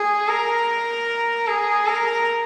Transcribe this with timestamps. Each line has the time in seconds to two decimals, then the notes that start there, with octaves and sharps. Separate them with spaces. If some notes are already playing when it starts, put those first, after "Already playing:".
Already playing: G#4
0.28 A#4
1.47 G#4
1.87 A#4